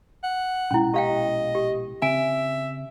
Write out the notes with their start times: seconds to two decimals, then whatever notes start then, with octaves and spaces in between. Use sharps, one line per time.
0.24 F#5
0.71 A#1 B2 G#3 C#4 E4
0.94 G4 D#5 F5 G5
1.55 G4
2.02 C#3 C4 E5 G#5